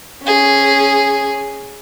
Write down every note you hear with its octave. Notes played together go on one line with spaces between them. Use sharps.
C#4 G#4